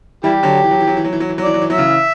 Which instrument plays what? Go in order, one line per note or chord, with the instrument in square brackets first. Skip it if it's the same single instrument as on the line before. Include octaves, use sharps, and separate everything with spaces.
[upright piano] E3 G3 [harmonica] E4 G4
[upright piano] D3 F#3
E3
F#3
E3
F#3
E3
F#3
E3
F#3
E3
F#3
[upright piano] E3 [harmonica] D5
[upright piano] F#3
E3
[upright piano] F#3 [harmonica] E5
[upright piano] C#3 E3